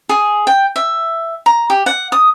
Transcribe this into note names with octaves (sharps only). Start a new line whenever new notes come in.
G#4
G5
E5
A#5
G4
F#5
D#6